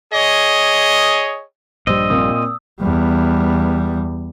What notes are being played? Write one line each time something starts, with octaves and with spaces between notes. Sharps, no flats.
G#4 C#5 D#5
A#1 G2 G3 C5 D#5 E6
A#2 A#3 C4 D#6
E2 G3